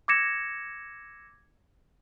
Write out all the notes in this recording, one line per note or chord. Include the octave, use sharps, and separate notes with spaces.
D6 E6 G#6 A#6 C#7 E7